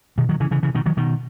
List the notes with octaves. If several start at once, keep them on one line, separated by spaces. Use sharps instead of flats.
B2 D#3
D#3 F#3
C#3 E3
C#3 E3
C#3 E3
B2 D#3
D#3 F#3
B2 D#3